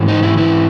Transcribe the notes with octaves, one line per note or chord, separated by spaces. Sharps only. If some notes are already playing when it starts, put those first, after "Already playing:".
Already playing: G#2 E3
D#4
E4
G#2 E3 E4